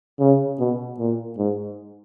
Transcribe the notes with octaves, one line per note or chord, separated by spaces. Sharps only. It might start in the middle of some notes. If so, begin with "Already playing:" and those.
C#3
B2
A#2
G#2